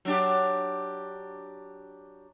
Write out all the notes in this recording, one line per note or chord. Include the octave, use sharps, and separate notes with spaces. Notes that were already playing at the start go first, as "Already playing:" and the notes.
F#3 D4 G4